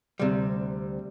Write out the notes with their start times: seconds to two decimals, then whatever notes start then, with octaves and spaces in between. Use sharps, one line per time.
0.19 D2 C3 G3